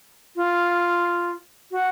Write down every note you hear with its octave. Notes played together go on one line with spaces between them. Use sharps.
F4
F#4